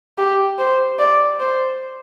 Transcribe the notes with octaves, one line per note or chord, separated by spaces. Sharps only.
G4
C5
D5
C5